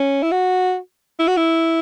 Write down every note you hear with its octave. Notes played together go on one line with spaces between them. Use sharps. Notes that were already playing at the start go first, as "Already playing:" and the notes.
Already playing: C#4
E4
F#4
E4
F#4
E4